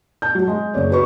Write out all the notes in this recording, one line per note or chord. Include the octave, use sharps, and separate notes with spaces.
A5 G6
F#3
G#3
F#1 C#5 D5
F#4 B4 C#6